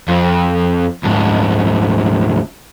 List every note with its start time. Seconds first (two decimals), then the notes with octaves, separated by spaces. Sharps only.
0.08 F2
1.03 D2 G#2